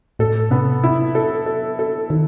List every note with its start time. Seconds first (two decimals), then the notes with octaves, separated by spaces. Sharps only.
0.19 A2 A4
0.51 C3 B3
0.84 C3 E4
1.15 A4
1.46 A4
1.79 A4
2.10 D#3 A4